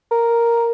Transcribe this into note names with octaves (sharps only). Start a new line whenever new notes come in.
A#4